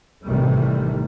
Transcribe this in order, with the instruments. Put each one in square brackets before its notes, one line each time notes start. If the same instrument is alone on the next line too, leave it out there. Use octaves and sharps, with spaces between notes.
[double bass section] A1 C3 D#3 E3 G3 A3